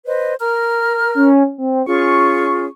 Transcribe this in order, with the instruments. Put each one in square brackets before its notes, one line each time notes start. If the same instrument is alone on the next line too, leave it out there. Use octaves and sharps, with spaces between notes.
[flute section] B4 C5 D#5
A#4 A#5 F6
[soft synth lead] C#4
C4
[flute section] C#4 F4 G#4 [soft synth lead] C#6